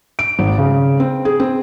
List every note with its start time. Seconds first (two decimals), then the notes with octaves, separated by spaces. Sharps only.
0.19 D7
0.39 G#1
0.58 C#3
1.00 C4
1.25 G#4
1.40 C4